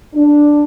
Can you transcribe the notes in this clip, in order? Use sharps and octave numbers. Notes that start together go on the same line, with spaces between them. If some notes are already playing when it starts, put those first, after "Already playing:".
D4